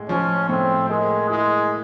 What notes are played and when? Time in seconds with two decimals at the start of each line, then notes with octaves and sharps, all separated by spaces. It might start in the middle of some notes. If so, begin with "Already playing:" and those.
Already playing: A2 G#3
0.09 F3 C#4
0.49 A2 C4
0.90 G#3 A#3
1.30 G#3 E4